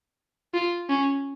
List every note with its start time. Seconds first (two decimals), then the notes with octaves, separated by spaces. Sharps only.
0.54 F4
0.89 C#4